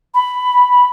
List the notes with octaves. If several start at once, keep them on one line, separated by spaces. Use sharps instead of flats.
B5